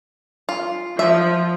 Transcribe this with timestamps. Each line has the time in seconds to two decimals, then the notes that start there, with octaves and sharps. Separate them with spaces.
0.49 F4
0.99 F3 E5